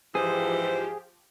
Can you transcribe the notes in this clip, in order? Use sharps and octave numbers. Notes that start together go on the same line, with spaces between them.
G#2 E3 F3 G4 G#4 C5